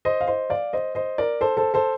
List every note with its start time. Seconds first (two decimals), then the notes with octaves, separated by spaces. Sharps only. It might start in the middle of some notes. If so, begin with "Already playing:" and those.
0.05 C5 D#5
0.21 F5
0.27 C5 D#5
0.50 D5 F5
0.73 C5 D#5
0.95 C5 D#5
1.18 A#4 D5
1.41 A4 C5
1.57 A4 C5
1.74 A4 C5